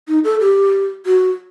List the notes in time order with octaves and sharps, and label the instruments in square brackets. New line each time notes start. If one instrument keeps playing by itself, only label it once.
[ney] D#4
A4
G4
F#4